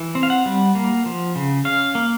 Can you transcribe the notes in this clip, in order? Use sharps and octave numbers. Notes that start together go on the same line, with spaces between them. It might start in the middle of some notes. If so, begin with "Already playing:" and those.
Already playing: E3
C4
F5
F#5
G3
A#3
F3
C#3
C#4 F5
A#3